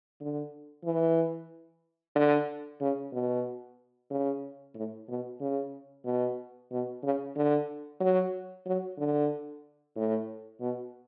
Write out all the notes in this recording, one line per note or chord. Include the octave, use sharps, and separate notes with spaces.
D3
E3
D3
C#3
B2
C#3
A2
B2
C#3
B2
B2
C#3
D3
F#3
F#3
D3
A2
B2